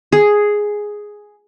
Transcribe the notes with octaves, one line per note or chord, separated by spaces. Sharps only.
G#4